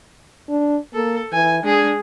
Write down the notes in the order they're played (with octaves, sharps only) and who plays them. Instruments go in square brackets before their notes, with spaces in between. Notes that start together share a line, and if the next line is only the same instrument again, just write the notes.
[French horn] D4
[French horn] A#3 [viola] A4
[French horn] E3 [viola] G#5
[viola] G#3 G#4 [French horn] D4